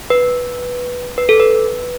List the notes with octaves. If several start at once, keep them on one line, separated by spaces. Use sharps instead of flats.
B4
B4
A4
B4